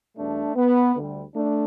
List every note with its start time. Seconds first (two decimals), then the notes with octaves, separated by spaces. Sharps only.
0.17 E2 B2 G3 A3 D4
0.56 B3
0.96 D2 D3 G3
1.35 A3 D4